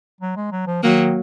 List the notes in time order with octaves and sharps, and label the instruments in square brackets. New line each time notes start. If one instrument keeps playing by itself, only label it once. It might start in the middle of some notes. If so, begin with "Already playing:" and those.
[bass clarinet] F#3
G#3
F#3
F3
[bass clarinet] D#3 [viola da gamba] F#3 A#3